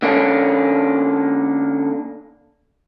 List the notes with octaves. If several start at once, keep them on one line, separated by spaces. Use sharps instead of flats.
D3 A#3 C#4 D4